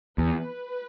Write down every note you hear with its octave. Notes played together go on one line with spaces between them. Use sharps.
E2 B4